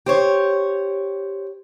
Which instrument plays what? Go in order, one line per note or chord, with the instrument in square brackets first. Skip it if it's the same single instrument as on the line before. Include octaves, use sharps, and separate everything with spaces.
[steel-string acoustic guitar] G4 C5 C#5